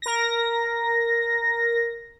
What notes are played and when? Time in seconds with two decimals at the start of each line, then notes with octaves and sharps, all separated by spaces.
0.02 A#4 A#6